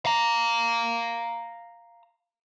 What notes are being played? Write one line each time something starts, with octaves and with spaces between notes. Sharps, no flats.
F5 A#5